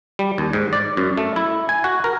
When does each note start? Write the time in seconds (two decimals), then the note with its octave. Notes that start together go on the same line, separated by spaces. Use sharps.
0.19 G3
0.38 D#2
0.53 G#2
0.73 D5
0.97 F#2
1.17 A3
1.36 E4
1.69 G#5
1.84 F#4
2.04 A#4